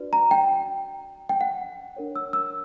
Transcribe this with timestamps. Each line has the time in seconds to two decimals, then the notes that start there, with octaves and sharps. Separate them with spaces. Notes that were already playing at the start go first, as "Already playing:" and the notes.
Already playing: D4 F#4 B4 D5
0.13 A#5
0.31 G5
1.29 G5
1.41 F#5
1.96 D4 A#4 C#5
2.16 E6
2.33 E6